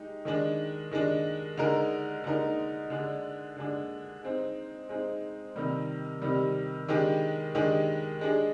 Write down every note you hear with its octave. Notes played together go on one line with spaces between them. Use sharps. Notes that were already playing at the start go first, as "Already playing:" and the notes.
Already playing: G#3 D#4 G4
D#3 G#3 D4
D#3 G#3 D4
D3 G#3 D#4 A#4
D3 G#3 D#4 A#4
D3 G#3 D4
D3 G#3 D4
G#3 C4 D#4
G#3 C4 D#4
C3 D#3 G3
C3 D#3 G3
D#3 G#3 D4 G4
D#3 G#3 D4 G4
G#3 D4 G#4